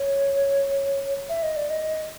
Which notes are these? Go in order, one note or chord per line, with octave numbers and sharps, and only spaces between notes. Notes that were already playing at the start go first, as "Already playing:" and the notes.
Already playing: C#5
E5
D#5
D5
D#5